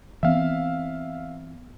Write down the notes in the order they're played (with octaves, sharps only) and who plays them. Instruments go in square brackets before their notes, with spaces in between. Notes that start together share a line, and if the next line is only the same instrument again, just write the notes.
[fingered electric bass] E3 B3 C4 [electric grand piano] E5 F5